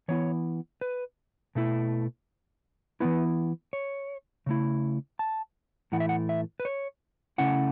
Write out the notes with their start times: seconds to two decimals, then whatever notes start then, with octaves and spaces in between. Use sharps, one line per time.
0.08 E3 B3 E4 C#5
0.81 B4
1.55 B2 A3 E4
3.00 E3 B3 E4 B4
3.73 C#5
4.46 C#3 A3 E4
5.19 A5
5.92 A2 E3 A3 E4 F#5
6.00 E5
6.09 F#5
6.29 E5
6.60 B4
6.65 C#5
7.38 C#3 A3 C#4 E4 F#5